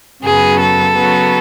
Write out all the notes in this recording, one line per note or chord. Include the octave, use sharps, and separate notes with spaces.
F#2 C#3 F#3 B3 G#4
A4
C#3 F#3 B3